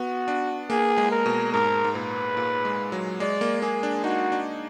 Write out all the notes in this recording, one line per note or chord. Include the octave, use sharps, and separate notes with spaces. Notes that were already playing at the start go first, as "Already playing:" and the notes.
Already playing: B3 F#4
D4
A#3 G#4
G#3
A#4
B2
G#2 A#4
G#2
A#2 B4
A#2
G#3
F#3
G#3 D5
A#3
A#3 G#4
D4
D#4 F#4
D4